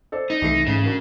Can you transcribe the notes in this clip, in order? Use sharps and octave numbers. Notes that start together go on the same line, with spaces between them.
A4 C5 D5
D#4
C2 E3 A3 C7
G#2 C#3
D4 F#4 A#4